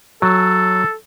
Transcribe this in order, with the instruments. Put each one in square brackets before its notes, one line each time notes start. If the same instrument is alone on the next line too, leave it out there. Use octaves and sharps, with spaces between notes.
[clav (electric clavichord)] F#3 [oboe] A4